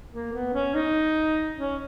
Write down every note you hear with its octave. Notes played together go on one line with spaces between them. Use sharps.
A#3
B3
C#4
D#4
C#4